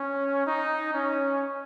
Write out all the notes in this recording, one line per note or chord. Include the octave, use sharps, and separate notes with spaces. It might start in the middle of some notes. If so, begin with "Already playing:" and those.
Already playing: C#4
D#4
C#4